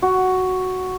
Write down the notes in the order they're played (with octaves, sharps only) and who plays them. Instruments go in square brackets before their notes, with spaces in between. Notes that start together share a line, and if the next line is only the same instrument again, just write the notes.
[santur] F#4